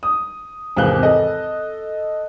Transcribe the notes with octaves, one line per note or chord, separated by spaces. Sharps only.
D#6
G#1 E2 C3 F5 F#6 G7
A4 D#5